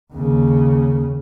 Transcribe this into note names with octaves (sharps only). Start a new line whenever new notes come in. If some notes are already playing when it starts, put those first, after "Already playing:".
D#2 C#3